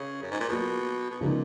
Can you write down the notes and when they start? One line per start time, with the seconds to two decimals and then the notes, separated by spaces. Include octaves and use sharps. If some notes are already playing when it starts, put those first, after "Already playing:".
Already playing: C#3
0.22 F#2
0.31 G#2
0.40 A#2
0.48 B2 F#3 A#3 F4 G#4
1.10 B2
1.21 A#2 C#3 F3 G#3 B3 D#4